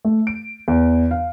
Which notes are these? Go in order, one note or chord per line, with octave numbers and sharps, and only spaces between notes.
A3
D7
E2
F5